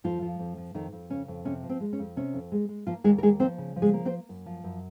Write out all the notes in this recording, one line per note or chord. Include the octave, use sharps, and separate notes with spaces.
F2 F3 F4
F3
F2
F3
F2 D#3 D#4
F2
C#3 C#4
F2
C3 C#4
F3
C4
G#3
C#4
F2
C3 C#4
F2
G#3
G#3
F3 A#3 F4
D#2 G#3 G#4
A#4
G#3 A#3 G#4
F3 C4 C5
C#3
F3
G#3 G#4
A#3
C4 C5
A#3
F#2
F3
F#2